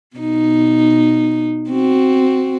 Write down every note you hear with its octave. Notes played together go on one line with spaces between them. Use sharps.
B2 D#4
C4 F#4